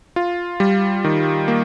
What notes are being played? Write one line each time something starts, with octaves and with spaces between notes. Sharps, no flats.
F4
G3
D#3
A#3